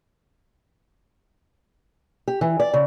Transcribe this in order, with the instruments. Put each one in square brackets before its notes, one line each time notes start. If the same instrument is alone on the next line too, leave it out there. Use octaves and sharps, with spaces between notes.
[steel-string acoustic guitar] G4
E3
D5
C#3